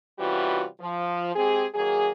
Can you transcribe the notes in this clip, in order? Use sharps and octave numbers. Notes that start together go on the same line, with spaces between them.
C3 E3 G3 C#4 F4 F#4
F3
G#3 C4 G4 G#4
D#3 F#3 A#3 G#4